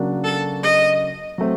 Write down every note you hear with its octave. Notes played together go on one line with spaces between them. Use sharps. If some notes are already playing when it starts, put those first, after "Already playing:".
Already playing: C#3 F#3 A#3 D4 F#4
A4
D#5
F#3 A3 C4